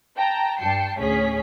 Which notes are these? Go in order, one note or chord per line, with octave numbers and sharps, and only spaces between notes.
G5 A5 A#5
G2 G5 A5 C7 C#7
D2 A2 C#4 G#4 C#5 B6